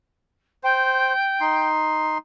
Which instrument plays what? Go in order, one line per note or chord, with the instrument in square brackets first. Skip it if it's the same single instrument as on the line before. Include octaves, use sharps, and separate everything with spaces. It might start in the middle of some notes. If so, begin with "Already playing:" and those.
[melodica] C5 [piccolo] G5
[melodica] D#4 C6